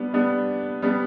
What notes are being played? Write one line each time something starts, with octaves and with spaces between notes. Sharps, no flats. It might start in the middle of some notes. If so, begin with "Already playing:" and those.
Already playing: G3 B3 D4
G3 B3 D4
G3 B3 D4